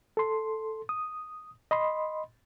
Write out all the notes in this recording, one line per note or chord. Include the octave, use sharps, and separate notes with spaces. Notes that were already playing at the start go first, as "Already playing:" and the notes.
A4 C6
D#6
D#5 B5 C6